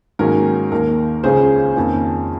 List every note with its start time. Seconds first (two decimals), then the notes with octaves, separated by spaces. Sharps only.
0.19 G#2 D#3 F#3 A#3 C#4 A#4
0.72 D#2 D#3 A#3 A#4
1.24 C#2 C#3 G#3 C#4 G#4 C5
1.76 F2 D#3 A#3 C#4